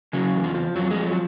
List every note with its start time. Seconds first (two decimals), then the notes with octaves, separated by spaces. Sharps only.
0.13 C#3 F#3
0.34 E2
0.44 F3
0.55 F3
0.75 F2 F#3
0.90 G#3
0.96 F3
1.06 F#3